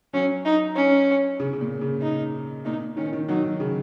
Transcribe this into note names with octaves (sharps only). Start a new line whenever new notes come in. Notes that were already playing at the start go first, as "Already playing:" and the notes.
F#3 C#4
D#4
C#4
C#3
C#3
A#2
C#3
D#4
A#2 D#4
D#3 C#4
D#3
F#3 D#4
D#3
C#3